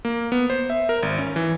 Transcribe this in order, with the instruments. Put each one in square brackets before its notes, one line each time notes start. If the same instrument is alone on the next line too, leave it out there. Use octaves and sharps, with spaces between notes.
[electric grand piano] A#3
B3
C5
E5
A#4
G#1
C#4
E3